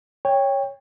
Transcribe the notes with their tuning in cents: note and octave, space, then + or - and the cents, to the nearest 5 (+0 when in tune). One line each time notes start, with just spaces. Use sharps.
C#5 +0 G5 +20